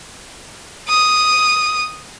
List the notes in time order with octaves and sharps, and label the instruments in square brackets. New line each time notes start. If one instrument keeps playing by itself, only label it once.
[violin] D#6